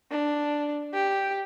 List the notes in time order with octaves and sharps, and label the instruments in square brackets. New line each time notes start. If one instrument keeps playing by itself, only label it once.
[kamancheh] D4
G4